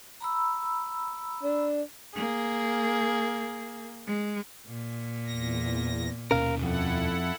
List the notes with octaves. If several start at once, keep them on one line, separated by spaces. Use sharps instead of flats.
A#5 B5 E6
D4
A#3 G#4
G#3
A#2
E2 A#6
D#2 B2 C#4 A#4 F5
F2 E4 A4 F#5